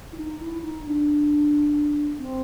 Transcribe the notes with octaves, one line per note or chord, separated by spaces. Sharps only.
E4
D#4
E4
D#4
D4
C4